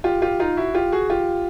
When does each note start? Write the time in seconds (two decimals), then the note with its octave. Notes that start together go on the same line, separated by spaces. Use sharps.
0.04 F4 G4
0.22 F4 G4
0.40 D#4 F4
0.57 E4 F#4
0.75 F4 G4
0.92 F#4 G#4
1.10 F4 G4